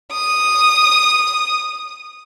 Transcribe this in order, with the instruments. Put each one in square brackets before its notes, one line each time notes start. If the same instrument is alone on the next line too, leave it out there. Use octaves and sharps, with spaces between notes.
[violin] D#6